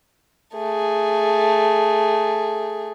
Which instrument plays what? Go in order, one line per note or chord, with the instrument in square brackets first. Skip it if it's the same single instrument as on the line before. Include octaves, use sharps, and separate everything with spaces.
[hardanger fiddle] A3 G#4